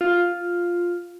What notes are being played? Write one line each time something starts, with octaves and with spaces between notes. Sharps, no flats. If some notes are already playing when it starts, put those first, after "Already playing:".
F4